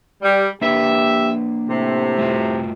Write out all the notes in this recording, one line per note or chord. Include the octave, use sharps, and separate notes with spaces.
G3
A#3 D4 G4 B4 E5
A2 C3
A3 F4 F#4